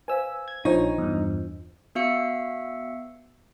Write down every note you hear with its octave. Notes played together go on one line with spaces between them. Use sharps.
B4 C5 F5 G#5 E6
G#6
A#1 D4 D#4 F4 C5 C#5
E2 G2
B3 F#4 E5 F5 E6 C#7